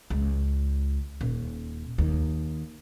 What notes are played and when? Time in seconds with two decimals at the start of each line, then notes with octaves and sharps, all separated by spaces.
0.10 C#2
1.21 D#1
1.98 D#2